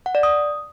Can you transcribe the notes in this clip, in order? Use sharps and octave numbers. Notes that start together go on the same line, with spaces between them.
F#5
D5
D#6